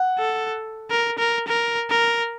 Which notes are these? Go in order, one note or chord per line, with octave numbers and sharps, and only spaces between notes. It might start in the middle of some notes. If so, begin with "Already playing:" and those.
Already playing: F#5
A4
A#4
A#4
A#4
A#4